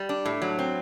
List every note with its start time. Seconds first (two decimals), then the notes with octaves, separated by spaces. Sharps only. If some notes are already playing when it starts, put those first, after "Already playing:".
Already playing: G3
0.09 D4
0.25 A2
0.42 F#3
0.59 C4